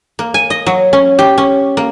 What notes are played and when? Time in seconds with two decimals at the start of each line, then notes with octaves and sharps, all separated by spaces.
0.19 A#3
0.34 G#5
0.50 D#5
0.66 F#3
0.93 C#4
1.19 G4
1.38 C#4
1.77 A#3